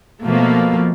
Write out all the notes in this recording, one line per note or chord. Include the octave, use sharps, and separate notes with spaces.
B2 F3 A3 A#3